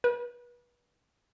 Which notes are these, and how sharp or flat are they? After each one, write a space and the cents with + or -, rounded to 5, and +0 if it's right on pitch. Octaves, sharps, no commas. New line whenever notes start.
B4 -30